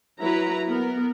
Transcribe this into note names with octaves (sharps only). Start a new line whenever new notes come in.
F#3 E4 B4 A#5
B3 A#4